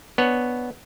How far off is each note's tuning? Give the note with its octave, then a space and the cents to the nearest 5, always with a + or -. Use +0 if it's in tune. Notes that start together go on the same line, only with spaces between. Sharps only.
B3 +0 D4 +0 C#5 +0